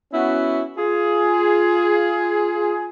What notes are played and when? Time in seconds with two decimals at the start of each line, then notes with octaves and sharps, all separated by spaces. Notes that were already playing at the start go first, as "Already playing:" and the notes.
0.12 B3 C#4 E4 F#4
0.77 F4 G#4